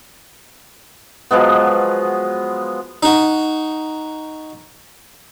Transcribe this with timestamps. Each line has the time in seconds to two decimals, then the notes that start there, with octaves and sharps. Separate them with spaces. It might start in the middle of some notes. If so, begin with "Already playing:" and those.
1.31 F3 F#3 G#3 B3
3.03 D#4 F#4